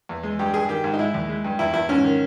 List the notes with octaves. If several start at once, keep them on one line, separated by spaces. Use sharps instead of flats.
E2
G#3
G2 G4
G2 G#4
D#3 G4
G#2
D#4
G#3 E4
D#2
G#3
G2
E2 E4
E2 E4
G#2 C#4
D#3